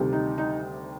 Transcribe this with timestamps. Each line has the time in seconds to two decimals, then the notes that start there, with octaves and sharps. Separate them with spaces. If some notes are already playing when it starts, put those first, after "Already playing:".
Already playing: D2 C3 D#3 G3
0.13 D#4
0.38 D#4